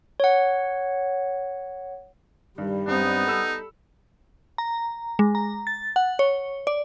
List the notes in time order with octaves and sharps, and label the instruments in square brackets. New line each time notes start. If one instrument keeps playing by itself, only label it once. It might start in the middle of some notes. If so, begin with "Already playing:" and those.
[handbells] C#5 F#5
[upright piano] G2 D#3 [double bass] G3
[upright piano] G2 C4 [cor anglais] B3 [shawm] D#4
[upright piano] A4 B5 E6
[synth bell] A#5
G#3
A#5
A6
F#5
C#5
D5